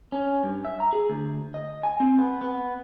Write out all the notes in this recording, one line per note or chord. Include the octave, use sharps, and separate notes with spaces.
C#4
G2
E5
A#5
G#4
D2
D#5
G#5
C4
B3
B3